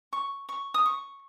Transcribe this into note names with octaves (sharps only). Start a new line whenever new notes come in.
C#6
C#6
D#6
C#6